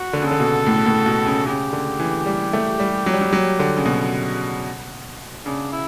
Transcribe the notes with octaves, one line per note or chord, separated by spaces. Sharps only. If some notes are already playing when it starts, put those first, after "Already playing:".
Already playing: F#4
D3
C#3
D3 A4
B2
A2
A2
B2
C#3
C#3 G4
D3
E3
G3
A3
G3
F#3
G3
F#3
F#3
D3
C#3
B2
C#3 D4
E4